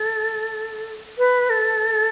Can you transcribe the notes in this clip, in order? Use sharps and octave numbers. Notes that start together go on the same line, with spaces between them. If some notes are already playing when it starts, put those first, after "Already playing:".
Already playing: A4
B4
A4